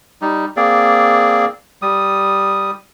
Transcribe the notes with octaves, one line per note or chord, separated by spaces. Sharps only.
G3 D#4
A#3 C4 G#4 D5
G3 D#6